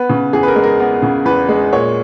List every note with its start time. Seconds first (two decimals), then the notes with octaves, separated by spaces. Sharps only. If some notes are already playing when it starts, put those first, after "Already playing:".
Already playing: B3 B4
0.09 C#3
0.33 E2 G#4
0.43 B4
0.48 A#4
0.56 G#3
0.64 A#4
0.80 B3 A#4
1.02 C#3
1.25 E2 B4
1.49 G#3
1.72 A#2 C#5